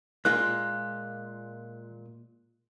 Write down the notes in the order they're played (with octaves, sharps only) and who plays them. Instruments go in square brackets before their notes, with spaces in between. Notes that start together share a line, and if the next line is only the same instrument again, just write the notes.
[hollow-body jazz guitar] A#2 G#3 F4 [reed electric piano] F#6